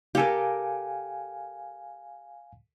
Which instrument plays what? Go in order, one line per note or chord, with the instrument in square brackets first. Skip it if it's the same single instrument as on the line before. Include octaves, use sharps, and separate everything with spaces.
[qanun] G4 A4 A#4 [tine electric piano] F5 G#5